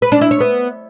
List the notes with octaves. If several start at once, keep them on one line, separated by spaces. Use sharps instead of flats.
B4
D4
E4
C#5
B3